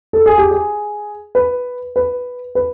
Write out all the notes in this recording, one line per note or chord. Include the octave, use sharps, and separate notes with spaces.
A4
G#4
G4
G#4
B4
B4
B4